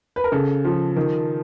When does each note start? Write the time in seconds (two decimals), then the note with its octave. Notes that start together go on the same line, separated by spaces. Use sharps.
0.16 B4
0.24 A#4
0.32 C#3 A4
0.65 F3
0.96 D#3